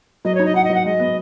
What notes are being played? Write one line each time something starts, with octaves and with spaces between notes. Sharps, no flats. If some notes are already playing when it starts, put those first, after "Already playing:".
F#3 D#5
D#4 C#5
D#5
D#4 F#5
D#5
F#3 F#5
G#3 D#5
B3